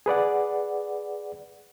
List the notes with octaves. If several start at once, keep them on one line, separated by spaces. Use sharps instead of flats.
G#4 B4 D5 F#5